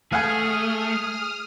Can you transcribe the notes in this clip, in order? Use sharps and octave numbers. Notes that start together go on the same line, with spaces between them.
A3 G#4 F5 F#5 G#5 D#6 F6